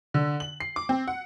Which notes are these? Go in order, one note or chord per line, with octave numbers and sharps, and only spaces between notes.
D3
F#7
C7
D6
C4
F#5